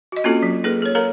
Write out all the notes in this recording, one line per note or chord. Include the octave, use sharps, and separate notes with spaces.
F#4 D#5
A#3 C4 C#4 F4 F#4 A4
F#3
A#3 D#4 G#4 A4 B4
A4 C#5
A4 A#4 C#5 F5 A#5